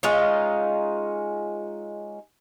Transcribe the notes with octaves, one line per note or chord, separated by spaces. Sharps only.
G#3 C#4 D#4 F4